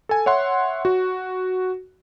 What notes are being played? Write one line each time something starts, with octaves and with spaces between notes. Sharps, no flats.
A4 G#5
C#5 E5 F#5 C6
F#4